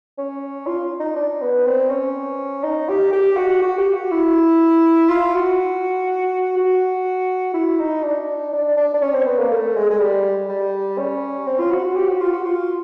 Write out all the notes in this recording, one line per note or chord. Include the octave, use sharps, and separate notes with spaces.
C#4
F4
D#4
D4
B3
C4
C#4
D#4
G4
G4
F#4
F#4
G4
F#4
E4
F4
F#4
F#4
E4
D#4
D4
D4
D4
D4
C#4
C4
B3
A#3
A3
G#3
G#3
G3
G3
C#4
C4
F4
F#4
F#4
G4
F#4
F4
F#4
F4